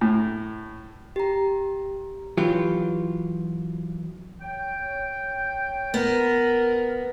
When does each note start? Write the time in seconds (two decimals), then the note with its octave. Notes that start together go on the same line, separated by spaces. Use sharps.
0.01 A2
1.16 G4 A#5
2.37 E3 F#3 F4 G4
4.41 C#5 G5
5.94 B3 A#4